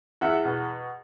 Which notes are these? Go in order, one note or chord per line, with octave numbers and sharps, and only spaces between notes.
E2 E5 F#5
B2